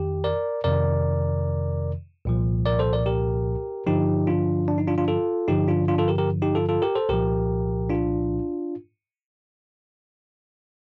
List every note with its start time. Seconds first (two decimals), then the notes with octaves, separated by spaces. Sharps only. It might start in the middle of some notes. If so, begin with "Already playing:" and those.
Already playing: F2 D#3 G4
0.24 A#4 D5
0.64 F2 C3 D#3 A#4 D5
2.25 C2 A#2 F3
2.66 A#4 D5
2.79 A4 C5
2.93 A#4 D5
3.06 G4 A#4
3.86 G2 D3 F3 D#4 G4
4.27 D4 F4
4.68 D4
4.78 D#4
4.87 D4 F4
4.98 D4 F4
5.08 F4 A4
5.48 G2 D3 F3 D#4 G4
5.68 D4 F4
5.88 D4 F4
5.98 F4 A4
6.08 G4 A#4
6.18 G4 A#4
6.42 D#4 G4
6.55 F4 A4
6.69 F4 A4
6.82 G4 A#4
6.95 A4 C5
7.09 C2 A#2 F3 G4 A#4
7.89 D4 F4